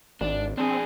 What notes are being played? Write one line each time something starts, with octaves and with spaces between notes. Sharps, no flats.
G#1 D4
C4 D4 G#4